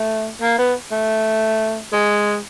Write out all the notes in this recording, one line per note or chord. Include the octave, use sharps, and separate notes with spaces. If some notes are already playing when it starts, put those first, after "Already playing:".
Already playing: A3
A#3
B3
A3
G#3